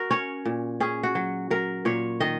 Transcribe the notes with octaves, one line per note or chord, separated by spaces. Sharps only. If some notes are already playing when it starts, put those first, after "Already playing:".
Already playing: F#4 A#4
C#4 C#5
A#2
C#4 G#4
F#4
F#3
F#3 A#4
A#2 C#5
D#3 D#5